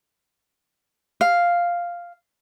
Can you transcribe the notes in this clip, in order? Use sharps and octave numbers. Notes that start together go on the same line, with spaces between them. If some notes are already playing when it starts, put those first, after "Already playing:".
F5